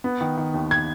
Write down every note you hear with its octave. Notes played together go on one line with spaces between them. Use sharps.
B3
D#3
D#3
D#2
G#6